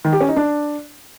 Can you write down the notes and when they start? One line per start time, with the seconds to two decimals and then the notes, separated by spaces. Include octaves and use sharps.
0.05 D#3
0.13 G4
0.20 C#4
0.28 D#4
0.36 D4